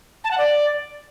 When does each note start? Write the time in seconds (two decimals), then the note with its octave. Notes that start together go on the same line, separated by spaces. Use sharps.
0.24 A5
0.31 F#5
0.38 D5